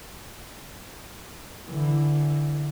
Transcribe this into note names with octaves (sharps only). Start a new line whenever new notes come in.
D3 E3